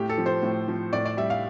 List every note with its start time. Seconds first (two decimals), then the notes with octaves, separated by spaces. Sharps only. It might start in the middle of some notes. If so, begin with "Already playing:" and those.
Already playing: A2 G4
0.09 A4
0.18 F3
0.26 C5
0.43 A2
0.68 F3
0.93 A2 D5
1.05 D5
1.17 G3 E5
1.30 F5